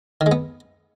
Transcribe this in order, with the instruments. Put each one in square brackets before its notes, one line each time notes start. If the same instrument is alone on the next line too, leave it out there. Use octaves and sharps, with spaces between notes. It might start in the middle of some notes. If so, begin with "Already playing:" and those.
[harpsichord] D#3
G#3
B3